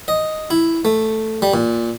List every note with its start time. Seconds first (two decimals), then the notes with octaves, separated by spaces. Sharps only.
0.08 D#5
0.50 E4
0.85 A3
1.42 G3
1.54 A#2